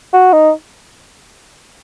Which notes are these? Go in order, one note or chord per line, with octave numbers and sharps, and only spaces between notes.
F#4
D#4